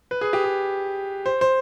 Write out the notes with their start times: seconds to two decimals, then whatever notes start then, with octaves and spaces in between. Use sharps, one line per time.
0.11 B4
0.21 G#4
0.33 G4
0.44 G#4
1.26 C5
1.41 C5